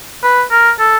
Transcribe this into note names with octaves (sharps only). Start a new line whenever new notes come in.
B4
A#4
A4